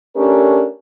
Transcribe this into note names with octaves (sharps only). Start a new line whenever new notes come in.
A3 C#4 D4 G4 A#4